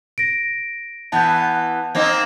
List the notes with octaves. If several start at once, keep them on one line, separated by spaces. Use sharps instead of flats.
A#6 D7
E3 B3 A5 G6
A#3 C4 D#4